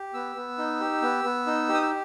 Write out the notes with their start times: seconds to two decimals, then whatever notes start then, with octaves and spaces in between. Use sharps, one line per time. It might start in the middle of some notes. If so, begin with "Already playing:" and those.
Already playing: G4
0.14 B3 E6
0.36 B3
0.58 D#4
0.80 G4
1.02 B3
1.24 B3
1.47 D#4
1.69 G4
1.74 D#6
1.82 E6